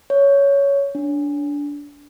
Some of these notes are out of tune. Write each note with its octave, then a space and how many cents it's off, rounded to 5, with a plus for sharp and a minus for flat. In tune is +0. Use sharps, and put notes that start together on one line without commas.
C#5 +10
D4 -20